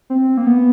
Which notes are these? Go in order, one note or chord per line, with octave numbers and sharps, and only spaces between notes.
C4
A#3
B3